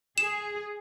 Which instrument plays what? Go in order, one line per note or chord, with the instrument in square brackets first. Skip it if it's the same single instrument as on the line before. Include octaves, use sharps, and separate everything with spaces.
[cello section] G#4 [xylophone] E7